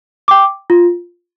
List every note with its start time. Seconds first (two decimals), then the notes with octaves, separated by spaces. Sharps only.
0.28 G5 D6
0.70 F4